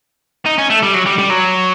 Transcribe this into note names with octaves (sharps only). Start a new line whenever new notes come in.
D#4
C#4
A3
G3
F#3
G3
G3
F#3